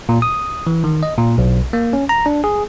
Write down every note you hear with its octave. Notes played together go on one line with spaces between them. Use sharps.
A#2
D#6
E3
D#3
D#5
A#2
B1
A#3
C#4
A#5
D4
G#4